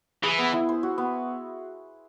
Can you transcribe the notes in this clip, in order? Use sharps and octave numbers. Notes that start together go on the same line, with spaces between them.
E3 G#4
B3
E4
C5
F#4
B3